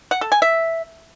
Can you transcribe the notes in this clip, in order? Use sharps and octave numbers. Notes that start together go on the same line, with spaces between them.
F#5
A4
G#5
E5